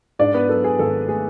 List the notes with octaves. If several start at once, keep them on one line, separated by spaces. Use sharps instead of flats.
G#2 D4 D5
B3 B4
F#3 A4
G#4
G#1 A4
A3 G#4